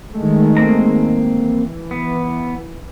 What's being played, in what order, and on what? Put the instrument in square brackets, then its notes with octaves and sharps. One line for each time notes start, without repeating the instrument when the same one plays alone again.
[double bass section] D#3 G#3 A3
[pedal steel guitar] A#3 C4 A#5
[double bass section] E3
[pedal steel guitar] B3